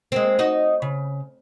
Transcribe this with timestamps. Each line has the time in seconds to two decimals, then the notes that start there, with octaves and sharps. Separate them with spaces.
0.12 G#3 A#3 C4
0.39 D#4 F#4 D#5
0.82 C#3